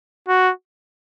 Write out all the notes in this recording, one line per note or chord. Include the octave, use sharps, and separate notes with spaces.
F#4